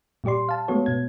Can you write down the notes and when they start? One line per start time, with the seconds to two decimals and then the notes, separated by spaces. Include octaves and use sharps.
0.24 A#2 G3 G4 D5 C6
0.49 F5 A5
0.68 G#3 A3 B3 F#4 C#5
0.86 B2 B3 G#6